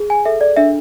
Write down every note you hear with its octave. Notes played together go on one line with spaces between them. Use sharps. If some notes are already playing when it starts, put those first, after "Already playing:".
Already playing: G#4
G#5
A4 E5
D5
D4 E5